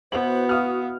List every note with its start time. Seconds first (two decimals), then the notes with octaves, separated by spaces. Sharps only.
0.12 B2 B3 E4 C5 F#7
0.49 F#4 F5 D#6 F6